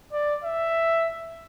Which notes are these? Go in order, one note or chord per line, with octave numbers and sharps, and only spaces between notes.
D5
E5